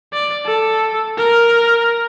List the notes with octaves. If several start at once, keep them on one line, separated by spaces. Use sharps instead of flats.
D5
A4
A#4